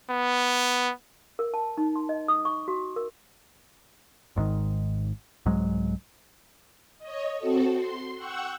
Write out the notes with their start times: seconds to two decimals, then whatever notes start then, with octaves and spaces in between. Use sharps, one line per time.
0.10 B3
1.39 A#4
1.54 A5
1.78 D#4
1.96 C6
2.09 D#5
2.28 D#6
2.45 C#6
2.68 F#4
2.96 A#4
4.36 G#1 G#2 B2 D#3
5.46 C2 G#2 F#3 G#3
6.98 C#5 D#5
7.38 C4 F#4 A4
7.76 C6
8.16 F#5 G5 C#6 E6 F#6